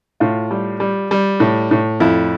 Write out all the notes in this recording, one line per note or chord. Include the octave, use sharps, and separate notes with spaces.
A2 F4
G3
G3
G3
A2
A2
F2 E4